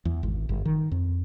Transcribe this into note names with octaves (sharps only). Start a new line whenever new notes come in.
E2
G#1
G1
D#3
F2